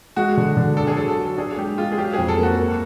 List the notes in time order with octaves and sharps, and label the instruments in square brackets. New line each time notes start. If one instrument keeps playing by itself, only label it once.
[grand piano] G#3 [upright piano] F#4
[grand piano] D3
D3
[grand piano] D4 [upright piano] A4
[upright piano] G#4
[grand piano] F#3 [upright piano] A4
[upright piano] A4
[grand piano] F#4
[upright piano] A4
[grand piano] D4 [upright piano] G#4
[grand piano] G#3 [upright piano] G4
[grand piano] G#3 [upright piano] F4
[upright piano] G#4
[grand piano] F#3 [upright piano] G4
[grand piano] F2 [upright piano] G#4
[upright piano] A4
[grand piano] A#3 [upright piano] F#4
[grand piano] A#3